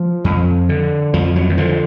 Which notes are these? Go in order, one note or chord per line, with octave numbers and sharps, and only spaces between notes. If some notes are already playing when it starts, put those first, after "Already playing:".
Already playing: F3
F2
D3
F2 F3
F#3
D#3
D3 F3